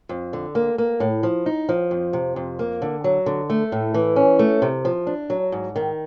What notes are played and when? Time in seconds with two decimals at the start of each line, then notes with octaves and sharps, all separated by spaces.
0.09 F2
0.33 D3
0.55 A#3
0.78 A#3
1.00 A2
1.23 F3
1.46 D#4
1.69 F3
1.91 F2
2.13 C3
2.36 F2
2.59 A#3
2.82 D3
3.04 F#3
3.26 D3
3.50 A3
3.72 A2
3.94 E3
4.16 C#4
4.39 A3
4.62 C3
4.85 F3
5.07 D4
5.30 F#3
5.52 G#2
5.76 D#3